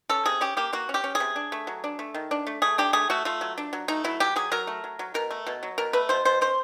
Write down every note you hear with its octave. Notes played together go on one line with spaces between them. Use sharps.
C#4 A4
C3 G#4
C#4 G4
A#3 G4
A#3 F#4
C#4
G4
C#4
G#4
C3
D4
A3
F#3
D4
A3
D#3
D4
A3
A3 G#4
D4 G4
A3 G#4
A3 F#4
A3 F4
F#3
D4
F#3
A3 D#4
F#3 E4
F#3 G4
F#3 G#4
F#3 A#4
A3
F#3
F#3
B2 A#4
A3
B2
F#3
B2 A#4
A3 B4
B2 C5
B2 C5
C#4 C5